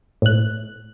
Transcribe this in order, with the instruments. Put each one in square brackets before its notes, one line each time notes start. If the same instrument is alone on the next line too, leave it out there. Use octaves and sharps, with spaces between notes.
[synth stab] A2 F#6